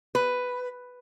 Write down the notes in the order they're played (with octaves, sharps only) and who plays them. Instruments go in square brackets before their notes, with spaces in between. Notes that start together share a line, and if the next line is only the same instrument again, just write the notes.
[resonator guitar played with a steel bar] B4